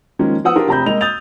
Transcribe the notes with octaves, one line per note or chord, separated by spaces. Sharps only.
D#3 F3 G#3 A#3 C#4
F3 B3 F#5 D#6 E6
D4 F4 G4 A#4
F1 C3 A#5 B5 G6
G#3 A#3 D#5 F7
D#6 G6 A6 F7